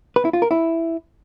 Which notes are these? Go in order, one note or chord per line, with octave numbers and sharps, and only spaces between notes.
B4
E4
F4
A#4
E4